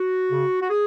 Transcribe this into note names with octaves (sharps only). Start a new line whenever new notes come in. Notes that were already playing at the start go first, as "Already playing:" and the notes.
Already playing: F#4
C#3
F#4
G#4